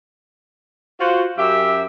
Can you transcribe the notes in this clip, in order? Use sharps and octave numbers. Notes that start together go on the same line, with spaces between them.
F4 F#4 C5
F#2 G4 E5